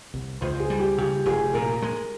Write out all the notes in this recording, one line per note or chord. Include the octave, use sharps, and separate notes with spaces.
C2
C#2 C5
G#4
G3
G4
C#3 G4
F1 G#4
A#2 A#4
G#3